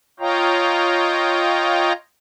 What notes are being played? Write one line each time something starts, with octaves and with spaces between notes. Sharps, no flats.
F4 C#5 D#5 F5 G5 A#5